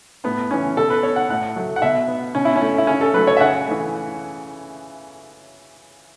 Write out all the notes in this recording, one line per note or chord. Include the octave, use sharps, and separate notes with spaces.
A2 B3
E3 B3 C#4
B2 A4
B4
B3 C#5
F#5
A2 F#5
F#3 A3
F#5
B2 E5
B3
B2 C#4
E4
C#4
A3
E4
C#3 C#4
A4
F#3 A3 B4
C#5
E5
C#3 F#5
E3 A3